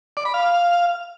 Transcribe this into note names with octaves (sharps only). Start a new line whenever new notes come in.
D5
B5
F5